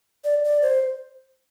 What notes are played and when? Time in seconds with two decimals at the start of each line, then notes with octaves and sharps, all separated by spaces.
0.24 D5
0.45 D5
0.62 C5